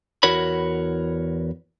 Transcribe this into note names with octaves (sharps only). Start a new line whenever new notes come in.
E2 E4 F#4 A#4 C#5 B5